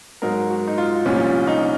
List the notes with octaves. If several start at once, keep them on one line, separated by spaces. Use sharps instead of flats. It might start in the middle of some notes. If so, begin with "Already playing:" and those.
G#2 F#3 A#4
F#4
D#4
F4
C2 A#2 F3 C#4
D#4